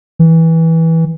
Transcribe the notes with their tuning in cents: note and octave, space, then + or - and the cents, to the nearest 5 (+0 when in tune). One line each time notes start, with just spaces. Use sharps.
E3 -15